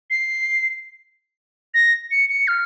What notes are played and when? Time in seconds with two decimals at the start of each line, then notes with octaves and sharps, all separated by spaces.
0.10 C7
1.74 A#6
2.11 C#7
2.29 C#7
2.48 F6